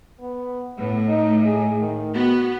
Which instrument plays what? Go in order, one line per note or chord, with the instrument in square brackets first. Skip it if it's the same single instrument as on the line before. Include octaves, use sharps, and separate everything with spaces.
[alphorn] B3
[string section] A2 [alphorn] B3
[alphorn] D#4
G#4
D#3
[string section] B3 [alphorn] F#4